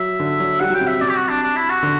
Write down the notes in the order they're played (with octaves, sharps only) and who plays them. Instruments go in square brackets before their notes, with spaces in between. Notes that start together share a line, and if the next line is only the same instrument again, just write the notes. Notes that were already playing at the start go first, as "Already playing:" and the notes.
Already playing: [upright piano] F#3 [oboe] E5
[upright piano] D3
F#3
[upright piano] G3 [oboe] F#5
[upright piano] F#3
[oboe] G5
[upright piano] C3
[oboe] E5
[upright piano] C3 [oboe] D5
[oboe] G4
F#4
D4
D4
E4
F#4
[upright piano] D3